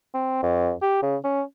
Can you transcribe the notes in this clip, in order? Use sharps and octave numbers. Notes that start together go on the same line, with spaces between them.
C4
F2
G4
C#3
C#4